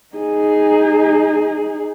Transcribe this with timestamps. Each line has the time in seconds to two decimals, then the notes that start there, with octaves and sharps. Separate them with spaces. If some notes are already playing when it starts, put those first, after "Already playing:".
0.16 D#4 G#4